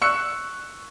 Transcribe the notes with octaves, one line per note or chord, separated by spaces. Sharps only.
C#6 E6 F#6 C#7